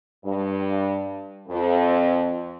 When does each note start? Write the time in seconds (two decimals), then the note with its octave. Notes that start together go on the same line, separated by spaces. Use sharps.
0.25 G2
1.48 F2